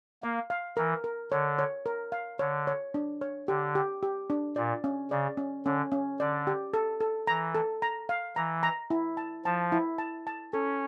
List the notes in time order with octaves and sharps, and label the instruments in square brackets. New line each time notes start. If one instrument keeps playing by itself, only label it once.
[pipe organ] A#3 [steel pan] F5
[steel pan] F5
[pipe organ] E3 [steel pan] A#4
[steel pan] A#4
[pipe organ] D3 [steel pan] C#5
[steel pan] C#5
A#4
F5
[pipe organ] D3 [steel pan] C#5
[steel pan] C#5
D4
C#5
[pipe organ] D3 [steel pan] G4
[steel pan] G4
G4
D4
[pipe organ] A#2 [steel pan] D5
[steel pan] C#4
[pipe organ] C#3 [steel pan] D5
[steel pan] C#4
[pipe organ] D3 [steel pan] C#4
[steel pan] C#4
[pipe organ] D3 [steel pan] D5
[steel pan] G4
A4
A4
[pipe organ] E3 [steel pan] A#5
[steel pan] A4
A#5
F5
[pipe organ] E3 [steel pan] A#5
[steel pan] A#5
E4
A5
[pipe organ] F3 [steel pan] A5
[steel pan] E4
A5
A5
[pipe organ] C#4 [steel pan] A4